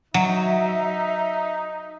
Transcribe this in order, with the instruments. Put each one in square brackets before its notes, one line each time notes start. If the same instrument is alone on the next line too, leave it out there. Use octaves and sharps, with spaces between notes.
[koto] F#3 [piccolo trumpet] D#4 [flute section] E5